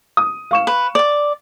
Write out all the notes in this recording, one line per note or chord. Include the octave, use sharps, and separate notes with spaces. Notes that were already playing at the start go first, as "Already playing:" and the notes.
D#6
F5 C#6 E7
B4
D5 D6